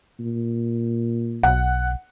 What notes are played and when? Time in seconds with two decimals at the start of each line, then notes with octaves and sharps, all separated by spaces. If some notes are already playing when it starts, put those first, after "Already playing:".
0.20 A#2
1.43 B1 F#5